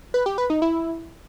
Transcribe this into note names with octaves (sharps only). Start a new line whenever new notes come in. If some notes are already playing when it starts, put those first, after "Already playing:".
B4
G4
B4
D#4
E4